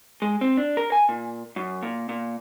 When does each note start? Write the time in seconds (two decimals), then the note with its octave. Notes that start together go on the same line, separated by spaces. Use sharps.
0.22 G#3
0.41 C4
0.57 D4
0.77 A#4
0.92 G#5
1.09 A#2
1.56 F#2
1.83 A#2
2.09 A#2